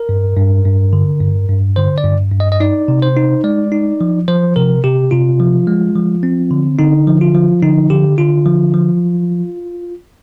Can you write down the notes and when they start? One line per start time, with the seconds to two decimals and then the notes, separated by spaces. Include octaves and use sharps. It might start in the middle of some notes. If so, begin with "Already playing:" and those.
Already playing: A#4
0.09 G2
0.37 G2
0.65 G2
0.93 D3
1.21 G2
1.49 G2
1.76 D3 C5
1.98 D5
2.05 G2
2.32 G2
2.40 D#5
2.52 D#5
2.60 D#4 D5
2.88 C3
3.02 C5
3.16 D#4
3.44 G#3 D5
3.72 D#4
4.01 F3
4.28 F3 C5
4.56 C3 A#4
4.84 C3 G4
5.11 C3 F4
5.40 F3
5.67 G#3
5.96 F3
6.23 C4
6.51 D3
6.79 D3 D#4
7.07 F3
7.21 F4
7.35 F3
7.62 D3 D#4
7.90 D3 G4
8.18 D3 F4
8.46 F3
8.74 F3